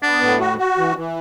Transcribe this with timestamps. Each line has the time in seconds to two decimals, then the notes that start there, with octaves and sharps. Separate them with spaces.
0.02 B3 D4
0.21 A2
0.40 F#4
0.58 F#4
0.78 E3
0.96 E3